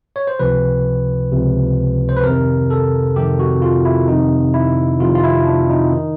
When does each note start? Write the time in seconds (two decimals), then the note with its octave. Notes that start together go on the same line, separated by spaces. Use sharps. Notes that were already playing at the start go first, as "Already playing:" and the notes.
0.16 C#5
0.27 C5
0.39 C#2 C3 F3 B4
1.32 C#2 C3 F3
2.09 C5
2.17 B4
2.24 F2 C3 D#3 A#4
2.70 A4
3.16 F2 C3 D#3 G4
3.39 F#4
3.62 F4
3.85 E4
4.08 F2 C3 D#3 D#4
4.54 E4
5.00 F2 C3 D#3 F4
5.15 F4
5.24 E4
5.46 D4
5.70 D#4
5.93 D#3